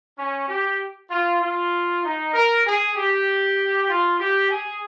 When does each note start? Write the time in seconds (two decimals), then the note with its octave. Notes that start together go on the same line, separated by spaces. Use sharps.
0.18 C#4
0.48 G4
1.10 F4
1.41 F4
2.03 D#4
2.33 A#4
2.65 G#4
2.96 G4
3.89 F4
4.20 G4
4.50 G#4